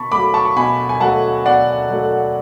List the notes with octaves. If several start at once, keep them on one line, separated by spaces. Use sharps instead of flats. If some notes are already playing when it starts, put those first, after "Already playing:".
Already playing: B2 A5 B5 C#6
F#3 A3 B5 D6
A5 C#6
C#6
B2 G#5 B5
G#5
F#3 A3 F#5 A5
B2 D5 F#5
F#3 A3